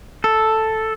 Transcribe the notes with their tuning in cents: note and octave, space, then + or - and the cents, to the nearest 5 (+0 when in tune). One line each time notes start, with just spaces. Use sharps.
A4 +0